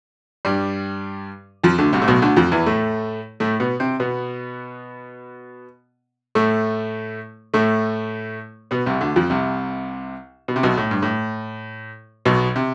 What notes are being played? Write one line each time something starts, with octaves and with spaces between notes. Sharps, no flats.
G2 G3
F2 F3
D2 D3
C2 C3
A2
B1 B2
D2 D3
F2 F3
E2 E3
A2 A3
A2 A3
B2 B3
C3 C4
B2 B3
A2 A3
A2 A3
B2 B3
C2 C3
D2 D3
F2 F3
C2 C3
B2
C3
B1 B2
A2
G2
A2
B1 B2
C3